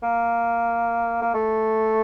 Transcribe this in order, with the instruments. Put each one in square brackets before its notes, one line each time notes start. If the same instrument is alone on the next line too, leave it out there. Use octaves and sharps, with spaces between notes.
[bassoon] A#3
A#3
A3